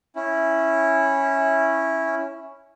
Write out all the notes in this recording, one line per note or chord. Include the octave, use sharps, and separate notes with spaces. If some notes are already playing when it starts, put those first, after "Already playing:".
C#4 E4